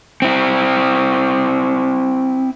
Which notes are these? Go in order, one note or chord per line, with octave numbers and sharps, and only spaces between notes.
C4 E4